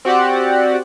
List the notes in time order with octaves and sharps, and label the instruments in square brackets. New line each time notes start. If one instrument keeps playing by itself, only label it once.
[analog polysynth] C4 F#4 G4 D5 F#5